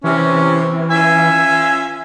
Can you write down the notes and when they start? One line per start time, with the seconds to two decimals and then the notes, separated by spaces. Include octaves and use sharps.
0.04 C3 E3 C#4
0.90 C#4 F4 E5 G#5